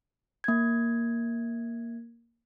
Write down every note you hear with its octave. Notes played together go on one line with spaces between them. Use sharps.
A#3 G#6